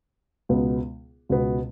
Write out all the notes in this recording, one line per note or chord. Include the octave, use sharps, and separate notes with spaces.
C#2 B2 B3
C#2 B2 B3